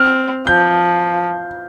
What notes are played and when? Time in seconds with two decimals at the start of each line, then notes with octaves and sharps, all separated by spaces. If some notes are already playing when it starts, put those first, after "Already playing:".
Already playing: C4 F6
0.47 F3 G6